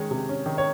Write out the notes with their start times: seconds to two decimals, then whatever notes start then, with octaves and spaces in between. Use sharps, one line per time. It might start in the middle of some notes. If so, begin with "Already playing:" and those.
Already playing: D#3 G#3 C#4 C#5
0.11 C3
0.29 C#4
0.46 D#3
0.58 C#5